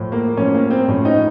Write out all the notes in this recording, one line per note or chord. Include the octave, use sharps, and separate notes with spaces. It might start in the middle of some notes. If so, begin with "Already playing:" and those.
Already playing: A2 F3
A#3
A2 F3 C#4
A#3
C4
A2 F3 C#4
D#4